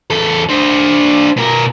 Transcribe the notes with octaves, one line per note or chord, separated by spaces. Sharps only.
E2 A4
D4 C5
B2 A#4